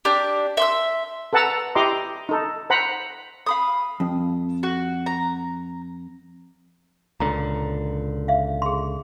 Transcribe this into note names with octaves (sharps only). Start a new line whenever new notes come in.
D4 G4
E5 C6 E6
A4 B4 F#5 A5 A#5 E6
E4 G4 D#5 A#5 C6 D6
D#4 A4
C5 F#5 A#5 B5
F5 B5 D#6
F2
F#4
A#5
C#2 A#2 D3 A#5
E5 F5
G#4 C6